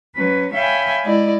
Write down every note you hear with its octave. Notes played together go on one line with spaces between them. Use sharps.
F#3 C#4 B4
C#5 E5 F5 G5 G#5 B5
G#3 E4 D5 D#5